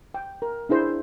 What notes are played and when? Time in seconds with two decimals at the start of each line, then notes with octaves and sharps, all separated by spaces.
0.14 G5
0.42 A#4
0.69 D4 E4 G#4 C5